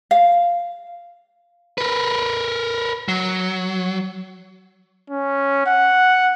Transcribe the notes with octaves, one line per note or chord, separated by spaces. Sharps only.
F5
A#4 B4
F#3
C#4
F#5